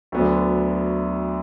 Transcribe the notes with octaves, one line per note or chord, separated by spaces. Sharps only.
D2 D3 F#3 B3 D4